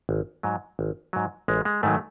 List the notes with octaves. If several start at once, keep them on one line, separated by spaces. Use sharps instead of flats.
G#1
G#2 F#3
G#1
G#2 F#3
A1 G#3
G#3
G#2 D#3 F#3 A3